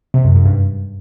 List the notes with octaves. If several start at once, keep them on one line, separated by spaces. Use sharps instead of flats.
C3
F#2
G#2
G2